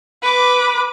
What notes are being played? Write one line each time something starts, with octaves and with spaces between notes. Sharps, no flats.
B4 D6